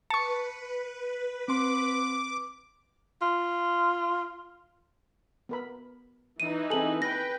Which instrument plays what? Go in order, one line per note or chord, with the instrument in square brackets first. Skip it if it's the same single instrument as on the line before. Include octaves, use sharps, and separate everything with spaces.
[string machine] B4 [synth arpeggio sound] A5 C#6 [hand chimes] C#7
[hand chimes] C4 C6 [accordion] D6
[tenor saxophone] F4
[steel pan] B3 A#4 B5
[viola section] E3 D#4 [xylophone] D#7
[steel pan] C4 G#4 A4 [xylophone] G#5 F#7
[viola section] B4 G5 [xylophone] A#6